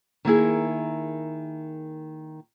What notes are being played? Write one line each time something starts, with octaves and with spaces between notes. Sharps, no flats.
D#3 A#3 E4 G#4